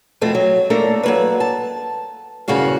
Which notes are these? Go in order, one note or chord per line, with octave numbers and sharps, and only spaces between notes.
F2 B2 A3 C4
F#3
A3 A#3 D4 A4 A#4
F#3 A#3 B4
A5
E2 G2 C#3 A#3 F#4 F5